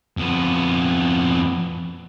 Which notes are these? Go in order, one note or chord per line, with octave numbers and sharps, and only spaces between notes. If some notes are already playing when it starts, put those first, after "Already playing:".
F2 B3